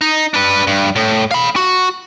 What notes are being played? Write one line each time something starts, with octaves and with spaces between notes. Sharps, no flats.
D#4
D4 B4
G2
A2
F5 B5
F#4